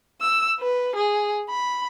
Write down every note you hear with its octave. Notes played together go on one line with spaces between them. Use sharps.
E6
B4
G#4
B5